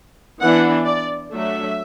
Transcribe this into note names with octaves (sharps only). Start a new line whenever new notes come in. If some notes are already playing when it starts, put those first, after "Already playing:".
E3 B3 D4 F#5
D5
F#3 A3 D4 E5